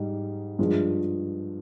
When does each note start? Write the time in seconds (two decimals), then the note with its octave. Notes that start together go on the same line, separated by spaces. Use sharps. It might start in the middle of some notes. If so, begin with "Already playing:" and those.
Already playing: G#2 G3 D#4
0.59 G2 F3 G#3